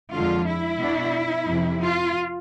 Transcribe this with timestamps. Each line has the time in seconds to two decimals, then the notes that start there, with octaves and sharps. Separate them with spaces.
0.13 F2 D3 G#3 F4
0.47 E4
0.80 B2 B3 D4
1.47 F2 C3 F3
1.82 F4